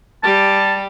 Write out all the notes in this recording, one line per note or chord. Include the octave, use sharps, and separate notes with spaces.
G3 G4 A5